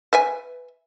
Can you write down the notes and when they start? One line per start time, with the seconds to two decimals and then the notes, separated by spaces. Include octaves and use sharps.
0.13 B4 E5 G#5